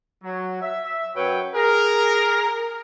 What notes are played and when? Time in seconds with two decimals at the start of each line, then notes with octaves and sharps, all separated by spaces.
0.24 F#3
0.62 E5
1.16 F#2 F#3 B4 C#5 G5
1.55 G#4 A#4